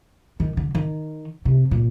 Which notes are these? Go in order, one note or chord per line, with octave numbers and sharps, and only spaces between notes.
D#3
D3
D#3
C3
A#2